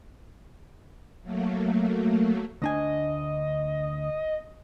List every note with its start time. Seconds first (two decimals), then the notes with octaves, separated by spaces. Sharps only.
1.23 F#3 A3 A#3
2.62 D2 D4 D#5 G#5